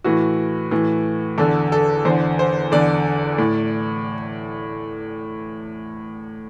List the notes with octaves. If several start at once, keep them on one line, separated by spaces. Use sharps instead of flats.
A2 E3 F#4
A2 E3
E2 D3 A4
A4
E2 D3 C5
C5
E2 D3 D5
A2